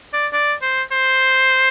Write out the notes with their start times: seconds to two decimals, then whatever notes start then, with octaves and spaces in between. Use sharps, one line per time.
0.13 D5
0.33 D5
0.62 C5
0.91 C5